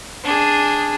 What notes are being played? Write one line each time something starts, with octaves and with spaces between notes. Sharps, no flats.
D4 G#4